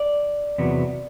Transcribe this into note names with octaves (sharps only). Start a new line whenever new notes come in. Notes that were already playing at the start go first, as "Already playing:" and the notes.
Already playing: D5
E2 C3 F#3 B3